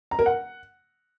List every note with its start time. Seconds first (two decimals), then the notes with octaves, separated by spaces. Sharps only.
0.11 A#5
0.19 A#4
0.26 F#5